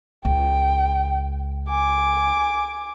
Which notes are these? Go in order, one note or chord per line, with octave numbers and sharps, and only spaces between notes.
C#2 G5
G#5 D6